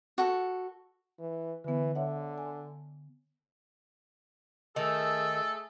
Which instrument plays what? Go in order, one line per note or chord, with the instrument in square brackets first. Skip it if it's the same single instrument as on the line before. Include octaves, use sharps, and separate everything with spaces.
[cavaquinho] F#4 A4
[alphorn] E3
[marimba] D3 B3 [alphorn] E3
[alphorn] D3 [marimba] C#5 E5 F#5
[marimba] G#5
[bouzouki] D#3 [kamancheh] A3 G#4 [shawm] A4 [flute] E6